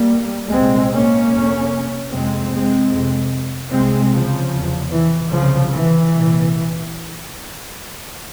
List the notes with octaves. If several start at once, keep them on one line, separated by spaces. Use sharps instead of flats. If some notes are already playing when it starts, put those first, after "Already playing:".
Already playing: G3 A#3
C2 A#2 G#3 C4
A#3 C#4
F2 C3
F2 C3 G#3 C4
G#3 C4
F2 C3
C2 C3 G#3 C4
C#3 F3
E2 C3
E3
C2 C#3 F3
C3
E3
C2 A#2